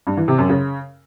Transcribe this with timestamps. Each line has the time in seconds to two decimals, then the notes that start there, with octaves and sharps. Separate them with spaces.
0.07 G2
0.17 E3
0.28 C3
0.38 F#2
0.49 C#3